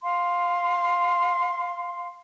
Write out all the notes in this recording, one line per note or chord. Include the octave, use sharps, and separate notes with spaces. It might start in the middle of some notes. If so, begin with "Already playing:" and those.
F5 C6